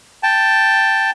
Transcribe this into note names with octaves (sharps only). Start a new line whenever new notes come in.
G5 A5